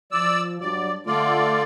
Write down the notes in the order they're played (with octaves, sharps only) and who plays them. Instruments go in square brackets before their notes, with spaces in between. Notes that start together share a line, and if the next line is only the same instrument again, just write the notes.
[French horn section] F3 [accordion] D5 E6
[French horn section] G2 F#3 [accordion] D5
[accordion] D3 F4 D5 [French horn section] A3